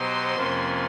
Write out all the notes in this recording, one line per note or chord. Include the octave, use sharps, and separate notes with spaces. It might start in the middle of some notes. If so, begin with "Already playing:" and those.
Already playing: B2 F#3 B3 D#4 G4 C5 C6
F2 C3 F3 A#3 C#4